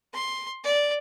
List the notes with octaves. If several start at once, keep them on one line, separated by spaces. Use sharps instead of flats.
C6
D5